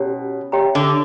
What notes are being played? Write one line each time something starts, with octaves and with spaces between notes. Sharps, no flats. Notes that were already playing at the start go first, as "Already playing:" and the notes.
Already playing: B2 C#4 E4 G4 C#5
G4 C#5 E5 G5 A#5
D3